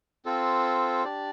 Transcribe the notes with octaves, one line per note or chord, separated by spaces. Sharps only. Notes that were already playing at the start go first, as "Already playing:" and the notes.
C4 F4 A4 C5
D4 G4 D5